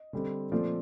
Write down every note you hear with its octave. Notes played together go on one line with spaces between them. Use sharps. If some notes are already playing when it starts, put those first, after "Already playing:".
Already playing: D#5
D3 G3 C4
A#2 F3 A3 C4 D5